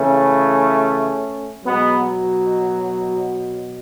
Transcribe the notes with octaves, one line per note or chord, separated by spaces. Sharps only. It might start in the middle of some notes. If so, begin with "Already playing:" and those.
Already playing: C#3 E3 A3 C#4
B2 F#3 G#3 B3